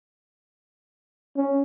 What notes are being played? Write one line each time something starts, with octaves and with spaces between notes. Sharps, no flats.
C#4